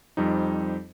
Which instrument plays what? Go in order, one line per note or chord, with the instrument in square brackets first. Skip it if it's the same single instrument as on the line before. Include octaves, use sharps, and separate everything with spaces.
[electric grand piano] F2 G3 C4 D#4